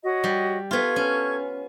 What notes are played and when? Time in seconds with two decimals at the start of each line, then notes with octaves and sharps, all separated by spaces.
0.03 F#4 C#5 D#5
0.24 G3
0.71 B3 F4 A4 C#6 G#6
0.96 C#4